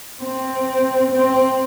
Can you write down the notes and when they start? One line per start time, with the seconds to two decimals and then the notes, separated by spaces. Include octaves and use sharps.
0.22 C4
1.11 C4